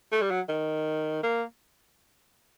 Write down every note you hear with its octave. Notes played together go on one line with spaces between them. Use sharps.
A3
G3
F#3
D#3
A#3